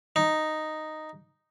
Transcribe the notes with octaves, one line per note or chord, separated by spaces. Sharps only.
D#4